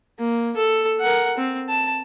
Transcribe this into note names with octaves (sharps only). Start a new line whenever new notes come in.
A#3
A4
A#4 F#5
C4
A5